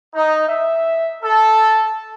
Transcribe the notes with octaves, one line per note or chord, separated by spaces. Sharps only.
D#4
E5
A4